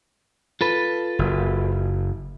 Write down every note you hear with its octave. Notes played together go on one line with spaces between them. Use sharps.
F4 A4 B4
F#1